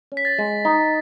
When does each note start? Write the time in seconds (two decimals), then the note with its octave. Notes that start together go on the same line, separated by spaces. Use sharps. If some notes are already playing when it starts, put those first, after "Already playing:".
0.12 C#4
0.17 B6
0.25 A6
0.38 G#3
0.65 D#4